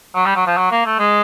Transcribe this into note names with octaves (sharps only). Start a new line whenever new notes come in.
F#3
G3
F#3
F3
F#3
A#3
A3
G#3